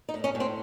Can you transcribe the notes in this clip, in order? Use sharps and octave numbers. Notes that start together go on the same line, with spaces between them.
D#4
A2
C#4
A2
C4